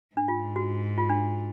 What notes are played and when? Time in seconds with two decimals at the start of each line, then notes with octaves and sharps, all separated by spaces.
0.15 G#2 D4
0.28 F4
0.56 F#4
0.98 F4
1.10 D4